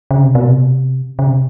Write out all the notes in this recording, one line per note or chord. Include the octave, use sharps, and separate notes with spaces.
C#3
C3
B2
C3
C#3
C3